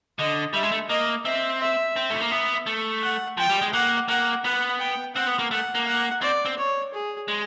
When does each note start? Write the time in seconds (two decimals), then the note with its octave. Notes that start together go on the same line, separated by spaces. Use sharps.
0.18 D3 D#5
0.53 G3 E5
0.63 G#3
0.72 A3
0.89 A#3 D#5
1.25 C4 E5
1.61 E5
1.96 C4
2.10 A3
2.21 A#3
2.31 B3 E5
2.67 A3
3.02 F#5
3.37 F3 G5
3.49 G3
3.61 G#3
3.73 A#3 F#5
4.08 A#3 F#5
4.44 B3 F#5
4.79 G5
5.15 C4 F#5
5.27 B3
5.39 A#3
5.51 A3 F#5
5.75 A#3
5.87 F#5
6.22 C4 D5
6.45 C4
6.57 C#5
6.93 G#4
7.28 G#3